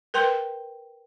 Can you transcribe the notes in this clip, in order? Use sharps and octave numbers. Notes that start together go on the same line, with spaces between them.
A#4 B4 G5 C6